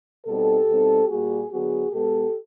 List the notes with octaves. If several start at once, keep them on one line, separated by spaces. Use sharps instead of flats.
B2 G3 C4 D#4 G4 A4
B2 G3 C4 D#4
A#2 G3 A#3 F#4 G#4
D3 F#3 B3 F#4 G#4
B2 G#3 B3 G4 A4